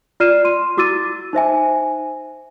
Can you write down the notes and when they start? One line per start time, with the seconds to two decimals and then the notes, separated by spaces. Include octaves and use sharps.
0.20 F4 D5 F6 C7 D#7 E7
0.45 C6 D#7
0.77 E4 F#4 D6 E6 A6 D#7
1.33 D#4 C5 E5 G#5